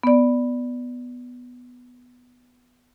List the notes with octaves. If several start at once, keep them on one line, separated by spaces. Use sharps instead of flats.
B3 D5